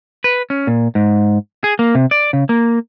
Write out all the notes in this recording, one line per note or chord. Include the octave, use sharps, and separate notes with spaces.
B4
C#4
A#2
G#2
G#4
A#3
C3
D5
C#3
A#3